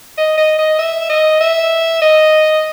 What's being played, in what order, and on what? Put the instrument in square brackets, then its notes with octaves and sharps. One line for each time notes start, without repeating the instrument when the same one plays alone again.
[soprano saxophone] D#5
D#5
D#5
E5
D#5
E5
D#5